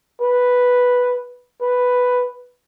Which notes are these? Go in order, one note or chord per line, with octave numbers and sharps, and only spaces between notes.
B4
B4